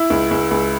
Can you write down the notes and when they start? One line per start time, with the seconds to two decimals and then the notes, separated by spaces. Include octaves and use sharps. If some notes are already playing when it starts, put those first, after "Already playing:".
Already playing: E4
0.10 C#2
0.31 C#2
0.51 C#2